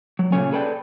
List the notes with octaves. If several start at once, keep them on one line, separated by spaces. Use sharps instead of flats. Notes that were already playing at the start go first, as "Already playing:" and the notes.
F#3
A#2 C#3 A3 C#4 C#5 G#5
G#4 A4 B4 D5 G5